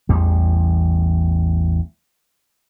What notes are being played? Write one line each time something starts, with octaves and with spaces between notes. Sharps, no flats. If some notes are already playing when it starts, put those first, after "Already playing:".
A1 E2 G3